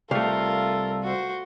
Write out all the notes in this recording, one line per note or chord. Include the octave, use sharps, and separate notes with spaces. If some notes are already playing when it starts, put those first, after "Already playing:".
C2 A3 F4 A4 A#4 F5
F#4 C5